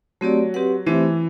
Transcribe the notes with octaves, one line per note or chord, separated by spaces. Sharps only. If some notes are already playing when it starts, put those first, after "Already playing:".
F#3 A3 C4 G4 D5
C4 G4 B4 F#5
E3 A3 C4 G4 C5 E5